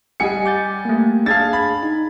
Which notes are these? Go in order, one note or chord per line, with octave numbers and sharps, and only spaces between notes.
G3 D#5 F#5 G#5 C#7
D6 G6 A6
A3 A#3
D4 G#4 F5 A5 G#6 A6
B5
D#4